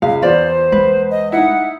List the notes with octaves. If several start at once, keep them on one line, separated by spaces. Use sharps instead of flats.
C#2 F5
E2 F4 B4 C5 D5
G#3 B4
D#5
D#4 E4 F#5